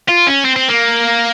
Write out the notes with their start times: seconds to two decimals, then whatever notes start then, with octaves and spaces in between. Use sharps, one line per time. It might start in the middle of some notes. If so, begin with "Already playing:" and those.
0.09 F4
0.27 C#4
0.45 C4
0.56 C4
0.68 A#3